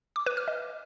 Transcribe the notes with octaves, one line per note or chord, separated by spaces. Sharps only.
D6
B4
F6
D#5